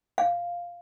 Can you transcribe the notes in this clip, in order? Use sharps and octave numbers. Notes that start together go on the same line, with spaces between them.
F5